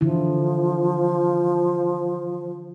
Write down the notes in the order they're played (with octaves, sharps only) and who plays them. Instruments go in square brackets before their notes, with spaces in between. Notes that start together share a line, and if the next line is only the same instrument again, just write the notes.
[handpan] D3 E3 E4 [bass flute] F3